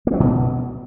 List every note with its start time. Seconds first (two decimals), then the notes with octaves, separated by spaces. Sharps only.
0.07 A#3
0.13 F#3
0.20 B2